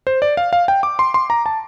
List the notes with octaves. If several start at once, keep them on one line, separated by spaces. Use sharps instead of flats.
C5
D5
F5
F5
G5
D6
C6
C6
A#5
A5